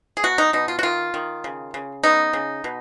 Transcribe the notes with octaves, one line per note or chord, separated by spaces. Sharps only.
G#4
B2 F#4
D#4
B2 D#4
F4
F#4
D#3 F4
D#3
C#3
C#3
B3 D#4
C#3
B2